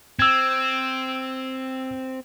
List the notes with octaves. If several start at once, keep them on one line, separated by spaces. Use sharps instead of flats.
C4 E6 G#6